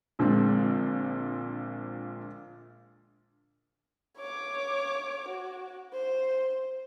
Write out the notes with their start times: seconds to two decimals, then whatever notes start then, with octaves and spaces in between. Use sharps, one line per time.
0.19 A#1 A#2 D3 G#3 C4
4.18 C#5 D6
5.28 F#4
5.93 C5